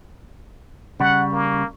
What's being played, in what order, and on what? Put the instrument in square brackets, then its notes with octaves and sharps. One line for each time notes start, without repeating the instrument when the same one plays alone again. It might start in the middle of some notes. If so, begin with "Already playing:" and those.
[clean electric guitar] C#3 G3 [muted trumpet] F#5
[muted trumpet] A#3